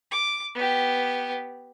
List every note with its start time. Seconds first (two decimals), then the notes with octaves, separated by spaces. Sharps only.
0.11 D6
0.55 B3 G4